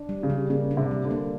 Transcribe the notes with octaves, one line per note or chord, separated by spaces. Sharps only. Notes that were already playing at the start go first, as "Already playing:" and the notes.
Already playing: D4
G3
C#3
G3
C#3 A#3
D4
C3
G3
D3
A#3